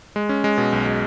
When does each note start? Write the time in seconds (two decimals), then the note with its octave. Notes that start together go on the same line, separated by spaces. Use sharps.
0.16 G#3
0.29 C#4
0.44 G#3
0.58 B2
0.72 B1
0.87 G#3